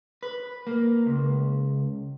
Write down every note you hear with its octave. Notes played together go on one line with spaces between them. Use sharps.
B4
A#3
C#2